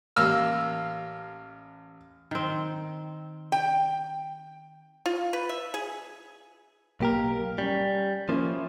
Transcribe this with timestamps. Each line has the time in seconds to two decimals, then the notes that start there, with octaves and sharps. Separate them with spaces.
0.16 A1 A#3 E6 F6
2.31 D#3 C4
3.52 G5
5.06 F4
5.33 B4
5.49 E5
5.74 G#4
7.00 B1 A#3 G4 A#4
7.58 G3 C#4
8.29 F3 A#3 C#4 E4 C#5